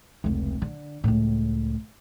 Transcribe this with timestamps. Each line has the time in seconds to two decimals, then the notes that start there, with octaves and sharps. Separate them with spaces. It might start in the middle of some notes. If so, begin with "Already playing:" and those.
0.24 F1 C#2
0.62 D3
1.04 C#2 A2